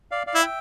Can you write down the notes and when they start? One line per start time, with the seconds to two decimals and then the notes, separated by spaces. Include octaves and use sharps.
0.11 D5 F5
0.27 D5 F5
0.35 E4
0.42 E5 G5